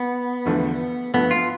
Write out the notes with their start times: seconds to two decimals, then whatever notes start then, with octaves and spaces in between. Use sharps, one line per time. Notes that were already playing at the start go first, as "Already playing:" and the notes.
Already playing: B3
0.45 E2 D3 F3 A3 D4
1.14 G2 F3 A3 B3
1.31 F4